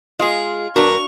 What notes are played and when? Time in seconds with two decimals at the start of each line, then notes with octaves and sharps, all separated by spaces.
0.19 G#3 F4 G#4 D#5
0.76 E2 G2 D4 F#4 A#4 C#6 F7